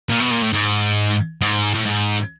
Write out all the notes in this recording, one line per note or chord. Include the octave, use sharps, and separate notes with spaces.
A#2
B2
A#2
A2
G#2
G#2
A2
G#2